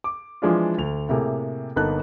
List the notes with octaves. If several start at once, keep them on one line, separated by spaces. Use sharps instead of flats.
D6
E3 F3 G#3 D4 F4
D2 F7
A2 C3 A#3 G#4
G1 A#3 B3 D#4 A5 F#6